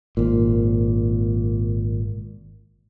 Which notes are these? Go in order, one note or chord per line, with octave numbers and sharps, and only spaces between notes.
G#1 A#2